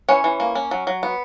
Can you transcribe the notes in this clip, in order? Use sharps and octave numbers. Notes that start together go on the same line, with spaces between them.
E3 C#4 C#5
E3
A#3
C#4
F#3
F#3
B3